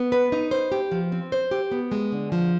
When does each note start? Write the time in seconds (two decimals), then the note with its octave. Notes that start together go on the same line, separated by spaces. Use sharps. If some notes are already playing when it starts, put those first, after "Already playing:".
Already playing: B3
0.12 B4
0.32 D#4
0.51 C5
0.72 G4
0.92 F3
1.12 C4
1.32 C5
1.51 G4
1.71 B3
1.92 G#3
2.12 D3
2.32 F3